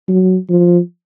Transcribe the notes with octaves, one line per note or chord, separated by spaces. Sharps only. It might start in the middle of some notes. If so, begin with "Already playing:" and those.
F#3
F3